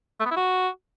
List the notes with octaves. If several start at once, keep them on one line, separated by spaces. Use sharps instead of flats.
A3
B3
E4
F#4